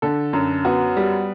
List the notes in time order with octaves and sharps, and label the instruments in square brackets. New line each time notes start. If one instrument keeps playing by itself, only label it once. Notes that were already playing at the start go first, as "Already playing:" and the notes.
[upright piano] D3 A4
F#2
B3 F#4
G3